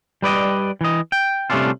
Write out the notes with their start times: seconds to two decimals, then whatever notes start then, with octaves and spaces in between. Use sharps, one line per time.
0.22 G3 B4 D5 D#5
0.81 E3 D#5
1.12 G5
1.50 C3 G3 A3 C#4 D4 F4